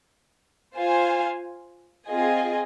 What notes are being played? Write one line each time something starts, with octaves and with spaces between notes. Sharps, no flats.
F4 C5 F5 G#5
C4 F4 G#4 D#5 G#5